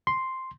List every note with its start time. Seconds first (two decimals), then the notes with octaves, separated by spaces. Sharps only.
0.07 C6